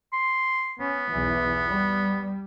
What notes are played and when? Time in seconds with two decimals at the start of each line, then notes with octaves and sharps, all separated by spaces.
0.13 C6
0.79 B3 C#4
1.11 B1 E2 E3
1.68 G3